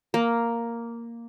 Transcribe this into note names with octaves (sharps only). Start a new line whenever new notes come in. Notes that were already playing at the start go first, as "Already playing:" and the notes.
A#3